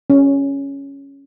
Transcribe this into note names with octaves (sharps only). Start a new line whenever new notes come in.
C#4